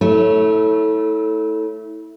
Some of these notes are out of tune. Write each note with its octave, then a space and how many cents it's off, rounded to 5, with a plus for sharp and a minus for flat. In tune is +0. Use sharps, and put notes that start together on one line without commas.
A3 +0 E4 -30 C#5 -5